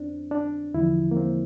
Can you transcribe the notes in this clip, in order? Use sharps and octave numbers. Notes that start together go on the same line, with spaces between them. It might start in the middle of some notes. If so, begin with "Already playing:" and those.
Already playing: F2 C4 D4
D4
E2 D3 F3 E4
A#3
C4